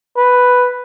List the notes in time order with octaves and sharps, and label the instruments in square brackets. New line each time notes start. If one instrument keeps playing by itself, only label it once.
[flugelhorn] B4